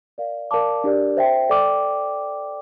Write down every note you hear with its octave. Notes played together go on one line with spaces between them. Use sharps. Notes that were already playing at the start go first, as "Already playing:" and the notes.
A#4 D5 F5
A#4 D5 F5 A5 D6
D4 G4 A#4 D5
C5 E5 G5
A4 D5 G5 D6